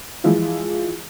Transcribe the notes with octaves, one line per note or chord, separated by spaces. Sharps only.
E3 F3 G#3 E4 F4